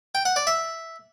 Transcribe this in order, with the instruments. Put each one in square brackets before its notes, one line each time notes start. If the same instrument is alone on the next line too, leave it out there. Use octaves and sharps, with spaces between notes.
[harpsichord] G5
F#5
D5
E5